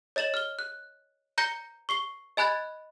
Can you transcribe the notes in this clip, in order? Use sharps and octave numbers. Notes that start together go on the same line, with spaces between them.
C#5 D#5 A6 E7 F#7
F6 G7
F#6
A#5 G6 A#6 C#7 G7
C#6 C7 G7
D#5 G#5 B5 F#6 G#6 A6